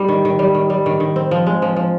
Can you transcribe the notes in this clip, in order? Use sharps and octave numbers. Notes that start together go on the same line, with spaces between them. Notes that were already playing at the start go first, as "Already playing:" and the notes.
Already playing: G3 D#4
D#3
D#3
G3
D#3
G3
D#3
D#3
C4
F3
G#3
F3
F3